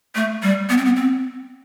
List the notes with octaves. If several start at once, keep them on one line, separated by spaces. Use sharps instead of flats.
A3
G3
B3
C4
B3
C4